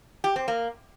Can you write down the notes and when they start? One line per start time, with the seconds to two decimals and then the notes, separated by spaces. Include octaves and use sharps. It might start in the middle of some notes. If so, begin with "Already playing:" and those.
0.24 G4
0.36 C4
0.48 A#3